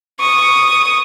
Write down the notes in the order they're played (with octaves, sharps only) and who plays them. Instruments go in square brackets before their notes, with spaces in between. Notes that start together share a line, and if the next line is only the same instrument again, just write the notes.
[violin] C#6 D#6